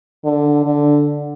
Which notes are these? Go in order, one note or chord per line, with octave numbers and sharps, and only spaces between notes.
D3
D3